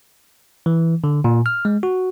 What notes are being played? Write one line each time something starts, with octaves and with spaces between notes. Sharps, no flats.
E3
D3
A#2
F6
G#3
F#4